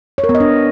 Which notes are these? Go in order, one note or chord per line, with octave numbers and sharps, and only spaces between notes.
C#5
A#4
B3
D#5
D4